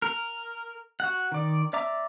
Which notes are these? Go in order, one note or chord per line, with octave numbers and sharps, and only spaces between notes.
A#4
F#4 F#5
D#3 D5
D5 E5 A#5 D6